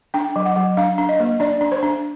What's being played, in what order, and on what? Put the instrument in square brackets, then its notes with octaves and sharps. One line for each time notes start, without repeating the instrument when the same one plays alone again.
[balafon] D4 G5
F#3
F#5
F#3
D4 F5
D4
D#5
A#3
D4 D5
D4
C5
D4